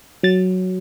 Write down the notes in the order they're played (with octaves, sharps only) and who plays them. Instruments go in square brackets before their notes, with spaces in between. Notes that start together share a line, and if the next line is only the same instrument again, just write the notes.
[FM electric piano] F#3 A6